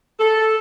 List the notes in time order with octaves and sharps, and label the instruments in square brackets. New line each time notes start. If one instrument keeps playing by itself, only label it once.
[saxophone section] A4